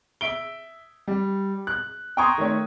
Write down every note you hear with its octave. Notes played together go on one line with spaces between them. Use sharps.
E5 D7 G7
G3
F#6
G5 A#5 C6 C#6 D#6 G#6
D#3 A3 C#5